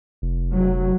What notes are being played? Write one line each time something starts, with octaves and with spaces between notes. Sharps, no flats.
F1
F#3